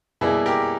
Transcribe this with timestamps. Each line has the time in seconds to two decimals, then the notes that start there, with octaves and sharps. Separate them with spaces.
0.21 B2 G3 A#3 E4 G#4
0.46 G4 A#4